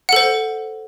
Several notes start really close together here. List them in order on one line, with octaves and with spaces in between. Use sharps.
F#5 A4 C5